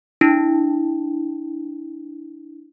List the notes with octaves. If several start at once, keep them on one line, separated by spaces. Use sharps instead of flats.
D4 E4